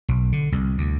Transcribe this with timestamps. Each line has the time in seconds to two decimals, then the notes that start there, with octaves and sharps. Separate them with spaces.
0.08 B1
0.32 D3
0.52 C2
0.78 D2